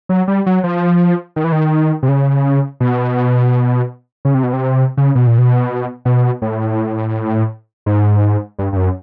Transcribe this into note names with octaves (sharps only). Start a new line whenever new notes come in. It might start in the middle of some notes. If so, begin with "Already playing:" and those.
F#3
G3
F#3
F3
D#3
E3
D#3
C3
C#3
B2
C#3
C3
B2
C3
C#3
B2
A#2
B2
B2
A2
G#2
G2
G2
F#2